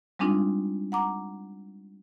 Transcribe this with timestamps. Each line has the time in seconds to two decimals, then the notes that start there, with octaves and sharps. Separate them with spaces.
0.19 G3 G#3 C4 D4 D#4 F4
0.92 F#5 A#5 D6